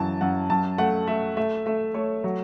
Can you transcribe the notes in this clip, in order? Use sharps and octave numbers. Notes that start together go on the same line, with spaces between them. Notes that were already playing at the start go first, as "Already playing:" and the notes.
Already playing: F#2 E3 A5
F#2 F#5
F#2 A5
A3 F#5
A3 E5
A3 E5
A3 E5
A3 C#5
F#3